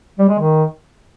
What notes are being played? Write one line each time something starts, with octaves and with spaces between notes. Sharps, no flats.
G3
G#3
D#3